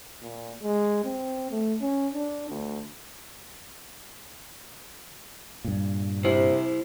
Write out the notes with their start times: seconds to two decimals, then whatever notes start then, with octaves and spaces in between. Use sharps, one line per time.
0.22 A#2
0.63 G#3
1.04 C4
1.51 A3
1.81 C#4
2.14 D4
2.49 D2
5.64 G2 A#2
6.25 C3 E4 C5